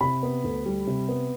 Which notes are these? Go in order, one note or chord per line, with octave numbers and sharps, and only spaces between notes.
C3 B5
B3
D2
G3
C3
B3